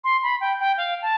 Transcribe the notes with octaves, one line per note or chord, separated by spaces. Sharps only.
C6
B5
G5
G5
F5
A5